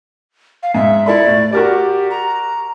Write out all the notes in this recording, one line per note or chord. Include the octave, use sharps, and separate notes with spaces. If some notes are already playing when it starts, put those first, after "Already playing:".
F5
G#2 E5
E4 A4 D5 B5
A2
F#4 G4 A#4 D5
A#5